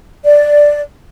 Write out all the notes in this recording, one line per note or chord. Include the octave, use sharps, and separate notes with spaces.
D5